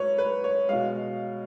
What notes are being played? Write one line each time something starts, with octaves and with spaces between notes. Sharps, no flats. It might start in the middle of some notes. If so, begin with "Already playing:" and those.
Already playing: G#2 F#3 B4 C#5
B4
C#5
B2 G#3 F5